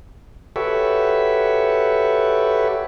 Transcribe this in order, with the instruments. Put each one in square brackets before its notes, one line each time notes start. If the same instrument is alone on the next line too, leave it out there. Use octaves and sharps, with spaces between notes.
[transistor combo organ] F#4 G4 A4 B4 C#5 E5